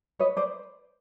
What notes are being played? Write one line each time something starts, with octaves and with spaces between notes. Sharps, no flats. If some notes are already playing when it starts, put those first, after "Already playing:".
B4 C#5 D#5
C5 D5